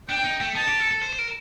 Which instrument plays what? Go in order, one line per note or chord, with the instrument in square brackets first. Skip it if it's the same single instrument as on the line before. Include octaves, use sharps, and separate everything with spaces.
[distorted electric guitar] D4 [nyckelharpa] G5
[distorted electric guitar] D#4
A3
[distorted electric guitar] D#4 [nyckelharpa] A5
[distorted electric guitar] G4
A4
A4
C5
C5
A#4